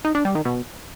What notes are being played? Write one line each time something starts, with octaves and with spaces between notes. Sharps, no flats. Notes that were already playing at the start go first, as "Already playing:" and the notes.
D#4
D4
G3
D#3
B2